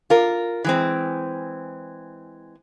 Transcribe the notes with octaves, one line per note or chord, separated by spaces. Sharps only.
F4 A#4
E3 G#3 C4